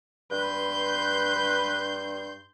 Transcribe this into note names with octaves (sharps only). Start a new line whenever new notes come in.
G2 B4 C6 G6